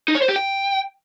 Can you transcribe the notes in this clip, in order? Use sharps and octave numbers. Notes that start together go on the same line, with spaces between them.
D#4
C#5
C5
G4
G5